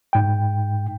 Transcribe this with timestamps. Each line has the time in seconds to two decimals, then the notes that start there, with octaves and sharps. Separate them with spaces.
0.13 G#2 G5